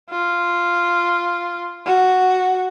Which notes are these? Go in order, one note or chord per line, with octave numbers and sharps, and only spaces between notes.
F4
F#4